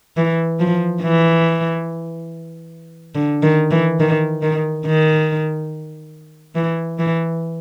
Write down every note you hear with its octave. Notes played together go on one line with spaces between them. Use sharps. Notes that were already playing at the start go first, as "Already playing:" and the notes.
E3
F3
E3
D3
D#3
E3
D#3
D#3
D#3
E3
E3